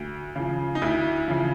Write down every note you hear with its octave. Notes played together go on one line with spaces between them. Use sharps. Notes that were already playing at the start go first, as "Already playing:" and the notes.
Already playing: D2
C#3 F3
D#4
D2 E4
C#3 F3